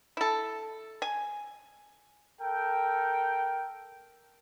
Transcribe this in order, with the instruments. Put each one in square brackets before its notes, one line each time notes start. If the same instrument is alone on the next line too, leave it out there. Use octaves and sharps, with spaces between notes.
[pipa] E4 A4
G#5
[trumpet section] A4 A#4 G5